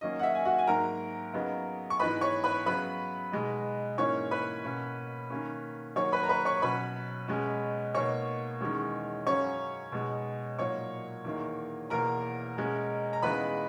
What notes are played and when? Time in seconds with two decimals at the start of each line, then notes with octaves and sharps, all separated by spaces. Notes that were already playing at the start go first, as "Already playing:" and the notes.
0.01 D#3 F#3 A#3 C#4 D#5
0.19 F#5
0.23 E5
0.35 G#5
0.45 F#4 F#5
0.58 G#5
0.67 G#2 F#3 A#3 A#4 A#5
1.33 C#3 F#3 B3 D#4
1.90 C#6
2.00 G#2 E3 B3 D#4 B4 B5
2.21 C#5 C#6
2.44 B4 B5
2.66 C#3 F#3 B3 B4 B5
3.32 B2 G#3 D#4
3.98 G#2 E3 A#3 C#4 C#5 C#6
4.31 B4 B5
4.64 B2 A#3 C#4
5.30 D#3 A#3 C#4
5.96 D#3 F#3 A#3 C#5 C#6
6.12 B4 B5
6.24 A#5
6.29 B4 B5
6.45 C#5 C#6
6.57 C#6
6.62 B2 F#3 C#4 B4 B5
7.28 B2 G#3 C#4
7.94 B2 A#3 D#4 C#5 C#6
8.60 E2 D#3 G#3 C#4
9.27 F#2 C#3 F#3 C#4 C#5 C#6
9.92 B2 G#3 D#4
10.59 A#2 F#3 A#3 D#4 C#5 C#6
11.25 E2 D#3 A#3 D#4
11.90 E2 B2 A#3 A#4 A#5
12.57 B2 G#3 C#4
13.13 A#5
13.22 E2 C#3 G#3 B3 D#4 B4 B5